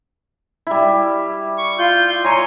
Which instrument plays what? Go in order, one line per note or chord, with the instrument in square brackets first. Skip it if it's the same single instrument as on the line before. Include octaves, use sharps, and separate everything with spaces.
[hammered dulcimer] G3 E4
[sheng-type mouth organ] C#6
F4 G6
[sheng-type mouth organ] C#5 G#5 [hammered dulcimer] A#5 C6